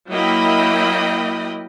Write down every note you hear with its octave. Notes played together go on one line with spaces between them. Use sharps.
F#3 A#3 E4 D#5 G5 B5